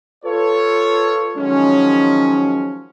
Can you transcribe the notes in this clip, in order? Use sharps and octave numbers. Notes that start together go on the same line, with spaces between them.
F4 A4 B4 C#5
D#3 F3 F#3 G#3 C#4